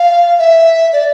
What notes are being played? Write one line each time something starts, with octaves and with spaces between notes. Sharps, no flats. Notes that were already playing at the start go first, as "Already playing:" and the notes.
Already playing: F5
E5
D5